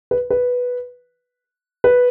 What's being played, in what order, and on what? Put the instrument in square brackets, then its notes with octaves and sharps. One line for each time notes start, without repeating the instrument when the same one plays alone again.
[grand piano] B4
B4
B4